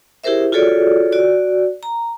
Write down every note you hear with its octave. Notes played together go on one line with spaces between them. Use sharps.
E4 G4 G#4 A#4 C5 E5
F4 F#4 G#4 A4 C#5 D5
F#4 D5
A#5